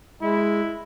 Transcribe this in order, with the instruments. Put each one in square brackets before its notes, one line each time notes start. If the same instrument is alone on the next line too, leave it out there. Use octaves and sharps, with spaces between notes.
[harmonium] G#3 [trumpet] E4